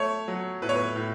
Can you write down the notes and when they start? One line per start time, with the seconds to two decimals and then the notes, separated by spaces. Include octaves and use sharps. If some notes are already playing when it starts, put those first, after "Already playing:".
Already playing: A3 C#5
0.28 F#3
0.62 A2 B4
0.69 C#5
0.76 B4
0.96 A2